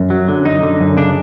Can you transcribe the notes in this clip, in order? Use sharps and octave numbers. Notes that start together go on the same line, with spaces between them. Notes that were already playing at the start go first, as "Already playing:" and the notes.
Already playing: F#2
F#3
D3
F#2 D#4
D3
F#2
C#3 D4